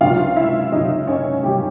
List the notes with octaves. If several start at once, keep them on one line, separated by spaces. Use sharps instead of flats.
C#2 C3 D#3 F#3 F4 F5
E4 E5
C#2 C3 D#3 F#3 D#4 D#5
C#4 C#5
C3 D#3 F#3 G3 G4